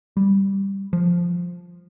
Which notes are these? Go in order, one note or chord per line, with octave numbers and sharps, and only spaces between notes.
G3
F3